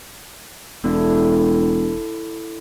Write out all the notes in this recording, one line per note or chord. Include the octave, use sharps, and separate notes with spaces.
E1 D3 E4 E5